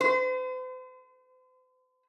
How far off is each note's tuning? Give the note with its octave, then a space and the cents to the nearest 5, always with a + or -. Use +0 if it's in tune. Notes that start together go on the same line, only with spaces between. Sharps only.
C5 -45